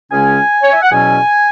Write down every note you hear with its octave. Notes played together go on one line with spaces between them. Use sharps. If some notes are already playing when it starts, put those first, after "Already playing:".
C#2 C#3 G#3 C#4 G#5
C#5
E5
F#5
E2 B2 F#3 C#4 G#5